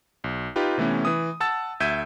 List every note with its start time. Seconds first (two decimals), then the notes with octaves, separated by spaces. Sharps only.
0.24 B1
0.56 D#4 F4 G4 B4
0.78 C3 E3 A3 B3 C#4
1.05 E3 D#6
1.40 F#5 A5 E6 A6
1.80 D2 E5 G6 G#6 D#7